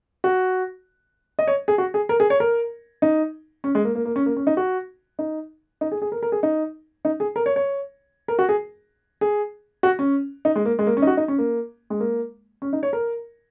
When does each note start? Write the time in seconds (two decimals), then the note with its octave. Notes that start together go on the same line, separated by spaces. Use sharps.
0.24 F#4
1.39 D#5
1.47 C#5
1.68 G#4
1.78 F#4
1.94 G#4
2.09 A#4
2.20 G#4
2.30 C#5
2.40 A#4
3.02 D#4
3.64 C#4
3.75 G#3
3.84 A#3
3.95 A#3
4.05 A#3
4.16 C#4
4.26 A#3
4.37 C#4
4.47 D#4
4.57 F#4
5.19 D#4
5.81 D#4
5.92 G#4
6.02 G#4
6.12 A#4
6.23 A#4
6.32 G#4
6.43 D#4
7.05 D#4
7.20 G#4
7.36 A#4
7.46 C#5
7.56 C#5
8.28 A#4
8.39 F#4
8.49 G#4
9.21 G#4
9.83 F#4
9.99 C#4
10.45 D#4
10.55 G#3
10.65 A#3
10.79 G#3
10.87 A#3
10.97 C#4
11.02 D#4
11.07 F#4
11.17 D#4
11.28 C#4
11.38 A#3
11.90 G#3
12.00 A#3
12.62 C#4
12.73 D#4
12.83 C#5
12.93 A#4